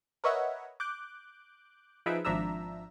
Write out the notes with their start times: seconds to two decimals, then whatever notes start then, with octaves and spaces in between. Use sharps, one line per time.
0.24 A#4 B4 C#5 D#5 E5 F#5
0.80 D6 F#6 G6
2.06 F3 D#4 G#4 B4 E5 D7
2.25 G#1 F3 D4 E5 A#5 E6